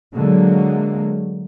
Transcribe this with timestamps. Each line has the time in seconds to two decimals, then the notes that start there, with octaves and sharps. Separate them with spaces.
0.15 D3 F#3 G#3 A#3